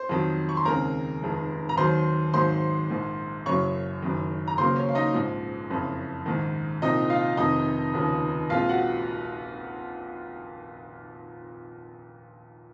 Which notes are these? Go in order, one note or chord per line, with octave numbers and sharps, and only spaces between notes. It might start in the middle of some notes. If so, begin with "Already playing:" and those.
Already playing: C5
F2 D#3 F#3
C#6
C6
D#2 C#3 G#3 C4 A#4 A#5
F1 F2 D#3 G#3
A#5
D#2 D#3 F#3 C5 C6
G#1 G#2 D#3 F#3 C5 C6
A#1 G#2 D#3
F#1 F#2 C#3 F#3 C#5 C#6
F#1 F#2 D#3
A#5
C#2 C#3 F#3 A#3 C5 C6
C#4 C#5
F5
D#4 D#5
A#1 G#2 F3
F#1 F2 C#3
A#1 G#2 D#3
C2 A#2 F3 C4 D#4 D#5
F4 F5
F1 F2 C3 D#3 D#4 D#5
F1 D#2 C#3 F3
A#1 A#2 G#3 C4 F4 F5
F#4 F#5